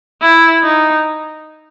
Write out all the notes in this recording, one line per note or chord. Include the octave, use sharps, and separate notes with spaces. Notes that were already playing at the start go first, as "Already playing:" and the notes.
E4
D#4